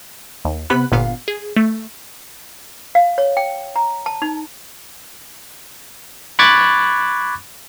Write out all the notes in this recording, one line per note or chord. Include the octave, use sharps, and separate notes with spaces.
D#2
C3 B3 B5 F#6
G1 A#2 B3 F5
G#4
A3
F5
C#5
G5
A#5
A5
D#4
B5 C#6 D6 F#6 G#6 A6